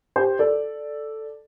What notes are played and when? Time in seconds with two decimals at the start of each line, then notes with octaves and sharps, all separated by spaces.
0.16 G4 C5
0.39 A4 D5